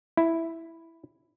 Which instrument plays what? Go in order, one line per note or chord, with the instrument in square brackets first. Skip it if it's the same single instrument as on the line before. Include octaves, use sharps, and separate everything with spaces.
[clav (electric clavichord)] E4